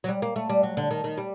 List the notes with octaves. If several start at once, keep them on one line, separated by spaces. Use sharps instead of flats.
F#3
G3
A#3
A3
G3
F#3
D3
D#3
D#3
G3